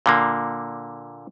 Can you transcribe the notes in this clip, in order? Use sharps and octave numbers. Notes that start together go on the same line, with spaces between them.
A#2 D3 A#3